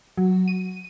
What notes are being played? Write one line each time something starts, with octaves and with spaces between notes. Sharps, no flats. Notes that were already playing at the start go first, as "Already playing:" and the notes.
F#3
D#7